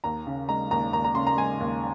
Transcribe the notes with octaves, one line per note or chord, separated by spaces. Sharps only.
D#2 A#5
C#3
G#3 A#5
D#2 A#5
D#2 A#5
A#5
C#3 C6
A#5
G#3 G#5
D#2